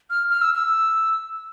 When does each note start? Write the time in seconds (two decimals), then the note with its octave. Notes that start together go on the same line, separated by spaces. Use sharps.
0.10 F6
0.30 F6
0.41 E6
0.55 E6